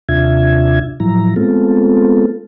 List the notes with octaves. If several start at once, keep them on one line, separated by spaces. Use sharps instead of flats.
D#2 C3 D4 F4 E5 G#6
A2 F3 F#3 E4 A#5
G#3 A3 B3 C4 F4 A4